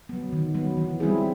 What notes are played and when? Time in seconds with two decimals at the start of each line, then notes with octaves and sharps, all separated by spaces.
0.09 F#3 B3
0.33 D#3
0.55 F#3 B3
0.77 E3
1.00 G3 C4 E4 G#4